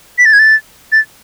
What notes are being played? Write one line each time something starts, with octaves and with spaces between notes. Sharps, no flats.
B6
A6
G#6
A6
A6